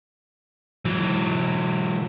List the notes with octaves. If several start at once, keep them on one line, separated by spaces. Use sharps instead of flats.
E3 F#3